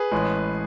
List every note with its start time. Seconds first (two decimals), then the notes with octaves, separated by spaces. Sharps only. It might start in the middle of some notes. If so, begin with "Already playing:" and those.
Already playing: G#4 B4
0.12 A1 A2 G#3